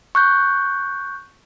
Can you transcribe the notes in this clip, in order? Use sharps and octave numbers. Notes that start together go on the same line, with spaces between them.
C#6 F#6 G6